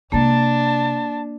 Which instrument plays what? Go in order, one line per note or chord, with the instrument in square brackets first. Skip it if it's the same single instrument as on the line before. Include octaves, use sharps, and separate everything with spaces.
[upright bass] C3 G#3 [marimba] A#3 [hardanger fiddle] D4 [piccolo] A5